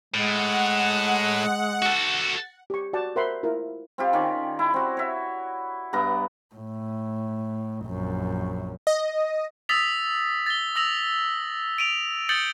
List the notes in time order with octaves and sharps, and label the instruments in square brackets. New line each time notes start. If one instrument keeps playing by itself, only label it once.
[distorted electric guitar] A2 [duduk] G#3 [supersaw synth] F#5
[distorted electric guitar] F#4 A4
[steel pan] G4 C#6
F#4 D5 F#5 G5 A5
A#4 C5 E5 F#5 B5 C6
E4 F4 A#4
[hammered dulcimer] C4 F4 G4
D#3 C#4 D5
E4
C4 F#4
C#5 E5
G2 B3 A#5 D6
[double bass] A2
A#1 F#2
[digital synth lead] D#5
[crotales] D#6 E6 A6 B6 F7
A6 G7
D#6 E6 A#6 F7 F#7
D7 D#7 F7
D#6 G6 A6 C#7 F#7 G7